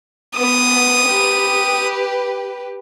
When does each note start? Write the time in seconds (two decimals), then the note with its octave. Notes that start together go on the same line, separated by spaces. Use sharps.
0.38 B3 D#6
1.07 G4 B4